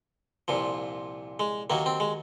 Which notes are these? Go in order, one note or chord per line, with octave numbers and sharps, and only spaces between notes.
C2 A#2 F3
G#3
D#2 D#3 F#3 A#3
C4
G#3